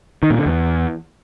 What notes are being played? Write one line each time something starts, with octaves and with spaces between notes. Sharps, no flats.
D#3
A#2
D3
E2